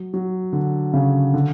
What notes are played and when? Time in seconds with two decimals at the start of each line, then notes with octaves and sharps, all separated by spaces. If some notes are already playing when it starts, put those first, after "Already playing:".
Already playing: F#3
0.14 F#3
0.53 D3
0.93 C#3
1.34 D3